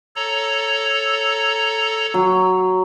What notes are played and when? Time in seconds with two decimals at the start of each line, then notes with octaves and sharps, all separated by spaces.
0.16 A4 C#5 A#5
2.14 F#3